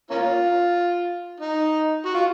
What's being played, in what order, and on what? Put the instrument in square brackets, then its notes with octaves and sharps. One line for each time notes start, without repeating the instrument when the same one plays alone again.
[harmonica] A#3 C#4 F4
D#4
F#4
F4